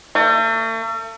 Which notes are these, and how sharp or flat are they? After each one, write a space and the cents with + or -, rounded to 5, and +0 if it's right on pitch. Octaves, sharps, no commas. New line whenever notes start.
A3 +40